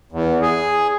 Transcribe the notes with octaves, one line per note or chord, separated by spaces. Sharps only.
E2
G#4